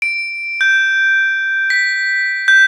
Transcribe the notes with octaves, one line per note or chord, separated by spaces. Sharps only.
D7
G6
B6
G6